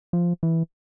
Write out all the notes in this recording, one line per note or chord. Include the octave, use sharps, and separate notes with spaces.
F3
E3